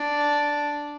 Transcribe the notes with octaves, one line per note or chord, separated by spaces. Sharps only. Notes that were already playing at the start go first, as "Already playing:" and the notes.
Already playing: D4